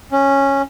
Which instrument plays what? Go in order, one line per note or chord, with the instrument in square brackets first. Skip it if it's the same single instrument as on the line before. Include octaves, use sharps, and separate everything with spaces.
[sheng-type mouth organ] C#4